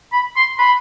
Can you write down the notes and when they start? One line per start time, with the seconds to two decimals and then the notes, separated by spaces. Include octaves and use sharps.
0.13 B5
0.36 C6
0.59 B5